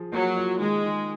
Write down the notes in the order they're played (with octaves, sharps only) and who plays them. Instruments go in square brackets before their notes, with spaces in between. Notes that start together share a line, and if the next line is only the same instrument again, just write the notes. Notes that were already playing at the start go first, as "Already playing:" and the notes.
Already playing: [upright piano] F3 G#4
[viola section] F#3 [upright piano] A#3
[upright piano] F4
[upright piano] D#3 [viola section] G#3
[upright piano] D#3